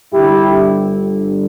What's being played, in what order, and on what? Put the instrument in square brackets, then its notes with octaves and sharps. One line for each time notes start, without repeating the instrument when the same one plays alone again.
[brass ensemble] G1 G2 D3 E4 G4